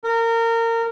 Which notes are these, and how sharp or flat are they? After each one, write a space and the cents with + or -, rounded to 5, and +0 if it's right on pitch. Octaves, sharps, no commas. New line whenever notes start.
A#4 -25